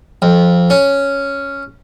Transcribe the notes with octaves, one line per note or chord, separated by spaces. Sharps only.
F2
C#4